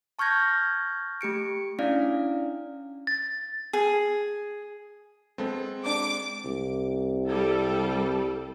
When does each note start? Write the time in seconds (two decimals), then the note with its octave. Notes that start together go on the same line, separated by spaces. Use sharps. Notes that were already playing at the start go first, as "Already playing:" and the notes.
0.19 A5 C#6 F6 G6 G#6 A#6
1.21 A3 G4 C#7 D7
1.79 C#4 D4 E4 D5 F5
3.07 A6
3.73 G#4
5.38 G#3 B3 C4 A4 C5
5.86 D4 D6
6.45 C2
7.28 G3 A4